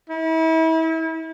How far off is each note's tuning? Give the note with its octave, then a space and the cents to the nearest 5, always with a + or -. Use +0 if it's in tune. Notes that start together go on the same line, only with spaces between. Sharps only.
E4 -35